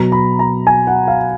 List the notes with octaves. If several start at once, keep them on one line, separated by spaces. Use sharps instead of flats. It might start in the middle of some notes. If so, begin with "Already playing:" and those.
Already playing: B2 F#3 A#5
B5
A#5
G#5
F#5
F5